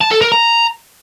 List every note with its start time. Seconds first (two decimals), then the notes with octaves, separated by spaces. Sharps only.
0.01 A5
0.11 A4
0.22 A#4
0.32 A#5